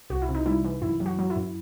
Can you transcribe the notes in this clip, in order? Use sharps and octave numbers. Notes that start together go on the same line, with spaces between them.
C2 F#4
E4
C3
D#4
G3 E4
E3
F#2 E4
F#3
F#4
F#3
E4
F#2